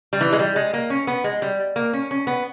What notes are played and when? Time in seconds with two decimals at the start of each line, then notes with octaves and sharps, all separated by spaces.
0.13 G3
0.21 E3
0.33 G#3
0.39 G3
0.56 G#3
0.73 A#3
0.90 C#4
1.07 B3
1.24 G#3
1.42 G3
1.76 A#3
1.93 C#4
2.11 C#4
2.27 B3